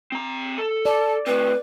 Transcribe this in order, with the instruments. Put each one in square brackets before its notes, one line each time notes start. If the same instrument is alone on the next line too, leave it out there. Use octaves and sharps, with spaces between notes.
[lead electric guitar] C4 A#5
A4
[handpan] D5 [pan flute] A5
[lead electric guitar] A2 C4 [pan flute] B4